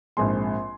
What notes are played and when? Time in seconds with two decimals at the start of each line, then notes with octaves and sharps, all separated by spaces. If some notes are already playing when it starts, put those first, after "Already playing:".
0.17 A#1 G#2 G#3 C4 G#5 C6